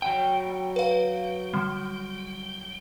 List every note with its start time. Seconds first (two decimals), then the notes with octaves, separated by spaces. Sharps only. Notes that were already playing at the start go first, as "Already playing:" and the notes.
0.02 F#3 G5
0.76 B4 F5
1.54 D3 G3